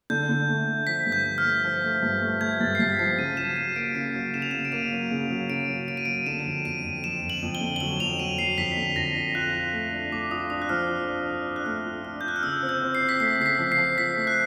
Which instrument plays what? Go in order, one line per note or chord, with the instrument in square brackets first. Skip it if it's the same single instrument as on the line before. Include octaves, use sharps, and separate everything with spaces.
[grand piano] D3 [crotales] G6
[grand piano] D3
A3
A3
[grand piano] F3 [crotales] B6
[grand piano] G2
[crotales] G6
[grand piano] F3
[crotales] F6
[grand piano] A3
F3
A3
G2
A3
[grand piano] A3 [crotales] G#6
[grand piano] G2 [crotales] A6
[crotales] C7
[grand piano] G2 [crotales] B6
[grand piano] F3 [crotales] C7
[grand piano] C#3 [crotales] D#7
[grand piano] F#3 [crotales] E7
[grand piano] F#3 [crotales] D#7
[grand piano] A#3 [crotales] D7
[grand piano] C#3 [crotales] C7
[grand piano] F#3
[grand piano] C#3 [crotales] E7
[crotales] F7
[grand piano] C#3 [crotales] E7
[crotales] D7
[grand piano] A#3 [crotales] D#7
[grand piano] F#3
C#3
F#3
[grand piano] C#3 [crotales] D7
[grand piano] F#3
[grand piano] A#3 [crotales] D7
[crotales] D#7
[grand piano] F#3 [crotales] D7
[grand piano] D3 [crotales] E7
[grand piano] F2
[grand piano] F2 [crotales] D#7
[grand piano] F2
[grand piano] F2 [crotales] E7
[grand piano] F2
[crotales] F#7
[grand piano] F2
[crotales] G7
[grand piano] D3
[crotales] G7
[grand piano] F#3 [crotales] F#7
[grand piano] F2 [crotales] F7
[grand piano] F#3 [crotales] D#7
[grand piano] F#3 [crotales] C7
[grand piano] F2 [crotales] B6
[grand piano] D3
[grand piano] F2 [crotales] A#6
[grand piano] F2
[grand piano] F4 [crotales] F#6
[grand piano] F4
A3
D4
[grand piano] A3 [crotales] D6
[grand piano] F4 [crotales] D#6
[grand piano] D4 [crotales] D#6
[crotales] F#6
[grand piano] F3 [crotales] F6
[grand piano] F4
D4
D4
D4
[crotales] F#6
[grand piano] A3 [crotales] F6
[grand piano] F4
[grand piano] D4 [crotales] F6
[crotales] G6
[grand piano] F4 [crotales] F#6
[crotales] F6
[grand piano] C#3 [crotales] E6
[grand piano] C4
[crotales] G6
[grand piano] C4
[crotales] C7
[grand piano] C4
[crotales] B6
[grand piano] A3 [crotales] C7
[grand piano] C#3 [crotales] C7
[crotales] B6
[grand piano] F3
[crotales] C7
[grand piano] F3
[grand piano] F3 [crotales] B6
[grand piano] A3
[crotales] F#6